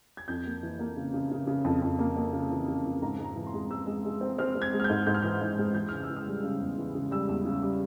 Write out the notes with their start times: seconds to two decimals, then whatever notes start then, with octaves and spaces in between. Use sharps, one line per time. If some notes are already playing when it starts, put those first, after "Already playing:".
0.17 G#6
0.28 F2 G6
0.46 A#3
0.63 E3
0.79 A#3
0.97 C#3
1.14 C#3
1.32 C#3
1.47 C#3
1.65 F2
1.82 F2
1.99 A#3
2.17 A#3
2.33 C#3
2.51 E3
2.68 C#3
2.85 F2
3.02 G#2 A#5
3.19 G#2
3.24 A#5
3.36 E3
3.47 C6
3.54 G#3
3.70 G#3 E6
3.87 G#3
4.05 G#3
4.21 C4
4.38 C4 F6
4.55 C4
4.62 G#6
4.73 G#3
4.80 F6
4.84 G6
4.90 G#2
5.07 G#2 G6
5.14 F6
5.22 E3 G6
5.41 G#2
5.58 G#3
5.74 E3 G6
5.89 C#3 F6
6.03 E6
6.09 E3
6.17 F6
6.27 G3
6.44 C#3
6.61 E2
6.77 E3
6.95 C#3
7.11 G3 E6
7.29 E2
7.45 C#3
7.62 G3